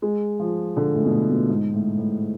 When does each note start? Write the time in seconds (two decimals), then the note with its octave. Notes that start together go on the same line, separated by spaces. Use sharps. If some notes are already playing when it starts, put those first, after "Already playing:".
0.02 G#3
0.39 F3
0.76 D3
0.94 A2
1.05 B2
1.12 A2
1.30 B2
1.49 G#2
1.73 A2
1.98 A2